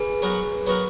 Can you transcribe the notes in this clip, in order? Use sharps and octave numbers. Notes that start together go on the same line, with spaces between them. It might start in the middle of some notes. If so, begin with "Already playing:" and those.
Already playing: G#4 B4
F#3 B3 F#4 A#4
F#3 B3 F#4 A#4